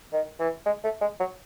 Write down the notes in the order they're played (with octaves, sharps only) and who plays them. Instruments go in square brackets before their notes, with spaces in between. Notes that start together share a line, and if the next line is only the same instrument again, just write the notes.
[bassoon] D#3
E3
G#3
A3
G#3
F#3